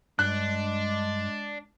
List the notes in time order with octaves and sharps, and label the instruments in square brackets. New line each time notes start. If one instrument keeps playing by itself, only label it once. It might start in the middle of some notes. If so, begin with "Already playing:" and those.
[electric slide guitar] G2 [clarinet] G#3 [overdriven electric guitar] D4 [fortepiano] F#6